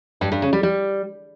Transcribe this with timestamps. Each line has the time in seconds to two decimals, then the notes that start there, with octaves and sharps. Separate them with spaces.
0.21 G2
0.32 G2
0.42 C#3
0.53 G3
0.63 G3